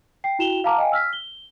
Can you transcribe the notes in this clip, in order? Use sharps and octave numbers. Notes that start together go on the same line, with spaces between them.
G5 C7
E4 F#4 G5 E7 F7 G7
F5 F#5 A5 A#5 D6 F6
D#5 F5 G5 G#5
E6 F6 B6
G7